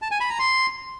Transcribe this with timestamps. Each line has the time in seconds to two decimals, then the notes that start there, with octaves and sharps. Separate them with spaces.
0.02 A5
0.11 G#5
0.21 B5
0.30 A#5
0.39 C6